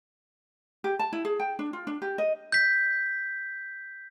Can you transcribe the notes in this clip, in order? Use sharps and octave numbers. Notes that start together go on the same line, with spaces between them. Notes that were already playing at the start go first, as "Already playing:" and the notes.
G4
A5
E4
G#4
G5
D4
F4
D4
G4
D#5
G6 B6